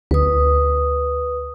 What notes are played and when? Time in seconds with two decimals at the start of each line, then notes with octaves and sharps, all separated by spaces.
0.11 D2 B4 D#6